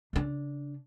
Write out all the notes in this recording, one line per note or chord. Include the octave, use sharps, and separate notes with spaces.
C#3 D4